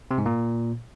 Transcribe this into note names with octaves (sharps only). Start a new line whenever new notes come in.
C3
G#2
A#2